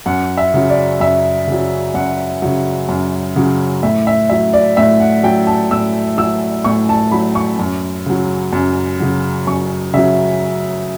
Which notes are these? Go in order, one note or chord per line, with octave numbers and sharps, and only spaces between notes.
F#2 F#5
E5
C#3 F#3
D5
F#2 E5
C#3 F#3
F#2 F#5
C#3 F#3
F#2
C#3 F#3
A2 E5
E5
F#3 E5
D5
A2 E5
F#5
F#3 G5
A5
A2 E6
F#3 E6
A2 C#6
A5
F#3 B5
C#6
F#2
C#3 F#3
F#2
C#3 F#3
F#2 C#6
C#3 F#3 E5